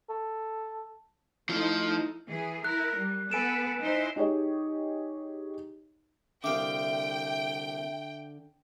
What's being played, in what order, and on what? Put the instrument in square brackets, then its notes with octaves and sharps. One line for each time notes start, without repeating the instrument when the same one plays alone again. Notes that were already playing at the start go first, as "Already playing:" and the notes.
[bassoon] A4
[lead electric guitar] F3 [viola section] A3 D#4 [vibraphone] E4
[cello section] E3 G#4
[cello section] E4 A#4 [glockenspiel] F#6
[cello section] G3
[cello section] B3 A4 B4 [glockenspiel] G#5 D7 E7
[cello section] D#4 E4 C5
[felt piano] D#4 G4 G#4 C#5 D#5
[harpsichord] C2 F5 D6 [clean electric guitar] D3 [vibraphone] E5 [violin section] G5